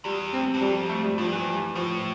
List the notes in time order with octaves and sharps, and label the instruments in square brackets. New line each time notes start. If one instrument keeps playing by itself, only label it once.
[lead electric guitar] E2 [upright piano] G3
[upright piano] C4
[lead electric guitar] G2
[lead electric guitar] F2 [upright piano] G3
[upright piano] A3
G3
[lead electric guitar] G2 [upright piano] F3
[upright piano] E3
[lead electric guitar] A2 [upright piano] F3